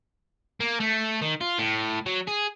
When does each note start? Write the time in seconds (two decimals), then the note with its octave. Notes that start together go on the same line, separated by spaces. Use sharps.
0.60 A#3
0.80 A3
1.22 D#3
1.41 F4
1.59 A2
2.06 F#3
2.28 G#4